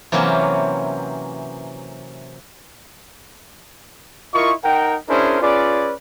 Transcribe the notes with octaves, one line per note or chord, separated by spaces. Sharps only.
C3 E3 F#3 A#3 C4 C#4
E4 F4 A#4 D#5 C#6
D#4 A#4 F#5 G5
C#4 D4 E4 G#4 A#4 C5
C#4 F4 G#4 B4 D5